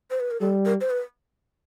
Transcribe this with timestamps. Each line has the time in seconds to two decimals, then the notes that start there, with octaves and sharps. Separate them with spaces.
0.11 C5
0.20 B4
0.31 A#4
0.40 G3 A4
0.65 A#4
0.81 C5
0.90 B4